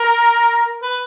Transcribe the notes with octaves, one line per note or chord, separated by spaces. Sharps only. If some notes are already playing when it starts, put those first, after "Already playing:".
Already playing: A#4
B4